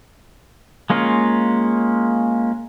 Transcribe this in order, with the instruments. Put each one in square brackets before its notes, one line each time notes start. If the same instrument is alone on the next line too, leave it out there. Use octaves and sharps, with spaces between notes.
[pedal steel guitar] G#3 A#3 C#4 F4